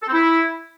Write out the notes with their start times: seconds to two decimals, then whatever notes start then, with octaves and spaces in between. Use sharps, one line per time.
0.02 A4
0.07 C4
0.13 E4